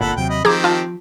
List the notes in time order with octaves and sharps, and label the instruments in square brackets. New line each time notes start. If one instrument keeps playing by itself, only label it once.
[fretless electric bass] G1 A#2 [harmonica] A4 F#5 B5
[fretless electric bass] D#2 C3 F#3 [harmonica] G5
[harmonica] D#5 B5
[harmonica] D#3 C4 G4 [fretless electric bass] F3 [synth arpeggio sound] G#4 A#5 D6
[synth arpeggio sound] F4 A5